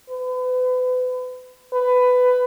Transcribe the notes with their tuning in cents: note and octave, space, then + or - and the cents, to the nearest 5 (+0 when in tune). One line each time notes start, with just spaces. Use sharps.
B4 +35
B4 +15